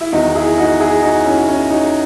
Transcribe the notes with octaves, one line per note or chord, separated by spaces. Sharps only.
E4
E2 D#3 D#4 F#4
E4 G#4
D#4 F#4
E4 G#4
D#4 F#4
C#4 E4
F#4
C#4 E4
D#4 F#4